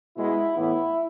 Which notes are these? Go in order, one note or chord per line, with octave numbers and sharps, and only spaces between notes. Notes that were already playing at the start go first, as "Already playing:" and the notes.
B2 G#3 B3 E4
A2 E3 B3 E4